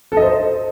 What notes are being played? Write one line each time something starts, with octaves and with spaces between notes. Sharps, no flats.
A4
D#5
C5